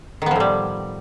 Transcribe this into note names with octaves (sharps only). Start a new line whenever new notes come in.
A2 D#3 F3 G3 B3